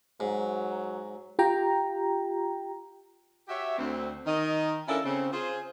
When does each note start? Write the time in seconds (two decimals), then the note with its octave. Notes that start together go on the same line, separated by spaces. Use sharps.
0.20 G#2 F#3
1.39 F4 G4 G5 A#5
3.49 F#4 G4 C#5 E5
3.78 D2 C4
4.26 D#3 D#5
4.88 C#4 D4 E4 F4 A4 A#4
5.05 C#3 C4
5.32 F4 G#4 C5